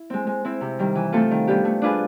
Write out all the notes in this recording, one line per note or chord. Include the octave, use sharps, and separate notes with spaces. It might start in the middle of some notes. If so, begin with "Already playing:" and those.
Already playing: E4
G#3 C4
G#3
C4 E4
C3
D#3 G3
E3
A3 C4 F4 A4
D#3
G3 B3 D4 G4
A3
D4 F4 G#4 B4